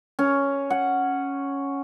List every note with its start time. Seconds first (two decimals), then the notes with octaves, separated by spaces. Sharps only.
0.19 C#4
0.70 F#5